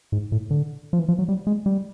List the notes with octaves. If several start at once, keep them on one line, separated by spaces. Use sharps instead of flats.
G#2
A2
D3
F3
E3
F3
F#3
G3
G#3
G3